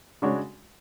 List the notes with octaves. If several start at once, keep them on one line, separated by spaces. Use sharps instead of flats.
C#3 G#3 D4 F#4 C#5